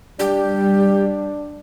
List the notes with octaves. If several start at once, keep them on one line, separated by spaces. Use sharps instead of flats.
G3 D4 G4